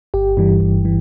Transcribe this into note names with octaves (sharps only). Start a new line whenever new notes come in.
G1 G4
G2 E3 G3
G1
E3